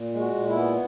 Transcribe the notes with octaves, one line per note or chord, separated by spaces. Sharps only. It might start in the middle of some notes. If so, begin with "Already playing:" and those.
Already playing: A#2
G#3
F#4
A#2
E4
B3